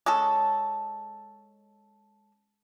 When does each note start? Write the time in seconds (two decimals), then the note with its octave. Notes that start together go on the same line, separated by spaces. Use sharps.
0.06 G#3 C#4 A4